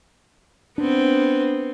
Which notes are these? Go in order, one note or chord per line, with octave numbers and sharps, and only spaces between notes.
B3 C4 D4